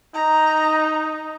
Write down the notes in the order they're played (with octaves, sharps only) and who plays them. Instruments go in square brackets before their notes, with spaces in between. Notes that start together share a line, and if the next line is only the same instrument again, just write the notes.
[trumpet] D#4 [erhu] A#5